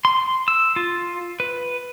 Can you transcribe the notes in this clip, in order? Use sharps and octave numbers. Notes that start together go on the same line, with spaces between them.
C6
E6
F4
B4